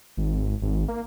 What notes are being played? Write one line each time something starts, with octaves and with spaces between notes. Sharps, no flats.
G#1
G#1
A#3